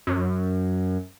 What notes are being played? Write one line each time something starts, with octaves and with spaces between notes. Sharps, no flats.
F#2